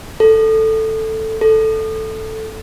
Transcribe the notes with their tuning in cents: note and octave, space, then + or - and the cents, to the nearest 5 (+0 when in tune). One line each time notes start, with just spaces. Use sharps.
A4 +5
A4 +0